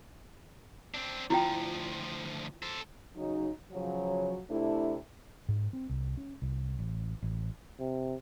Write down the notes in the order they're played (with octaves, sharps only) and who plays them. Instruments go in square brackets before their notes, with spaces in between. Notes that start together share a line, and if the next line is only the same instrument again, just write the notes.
[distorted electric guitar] C4 D4
[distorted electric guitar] D2 F3 [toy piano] E4 F4 G5
[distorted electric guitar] A4 C5
[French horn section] C#3 F#3 D#4
C#3 F3 F#3
C3 A3 D4 E4
[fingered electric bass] G#2
C4
C2
C#4
C2
A1
A1
[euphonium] C3